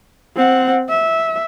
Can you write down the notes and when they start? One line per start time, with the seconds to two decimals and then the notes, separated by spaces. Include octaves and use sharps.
0.36 C4 F#5
0.89 E5